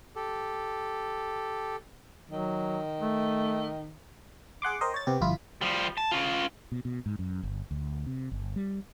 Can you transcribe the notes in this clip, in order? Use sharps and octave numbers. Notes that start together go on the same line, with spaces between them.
G4 A4
D#3 F#3
A3
G#4 F#5 C6 D6
A#4 C5 D#5 G5
C#5 A6
C3 B3 G4
G1 F2 E4 F4 B6
F3 G3
A5
C#4 F4
B2
B2
G#2
F#2
G1
D2
C3
G1
G3